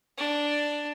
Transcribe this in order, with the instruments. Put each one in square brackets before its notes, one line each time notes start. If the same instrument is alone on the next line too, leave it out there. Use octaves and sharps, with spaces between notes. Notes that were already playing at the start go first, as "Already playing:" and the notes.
[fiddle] D4